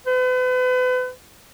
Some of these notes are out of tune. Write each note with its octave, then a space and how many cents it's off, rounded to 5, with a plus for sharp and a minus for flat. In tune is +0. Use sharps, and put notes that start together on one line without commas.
B4 +40